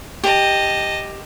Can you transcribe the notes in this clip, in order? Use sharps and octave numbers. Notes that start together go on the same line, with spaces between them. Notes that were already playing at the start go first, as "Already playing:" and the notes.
G4 D#5 A5